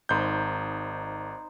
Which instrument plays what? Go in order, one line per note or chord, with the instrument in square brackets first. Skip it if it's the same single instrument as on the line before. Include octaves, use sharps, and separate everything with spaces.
[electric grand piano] G#1 G6 [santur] D#4 C5 B5